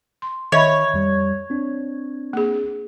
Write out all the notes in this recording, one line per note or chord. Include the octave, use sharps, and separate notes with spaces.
C6
D#3 C#5 D#5 E5 B5
F2 G3
C4 D4
A#3 G#4